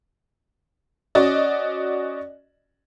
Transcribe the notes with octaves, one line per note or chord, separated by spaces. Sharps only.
C#4 F#4 D5 D#5